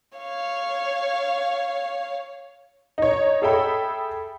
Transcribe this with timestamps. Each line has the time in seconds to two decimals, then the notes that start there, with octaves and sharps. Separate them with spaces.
0.19 C#5 F5
2.98 D#4 C#5
3.42 G#4 A4 E5 G5 B5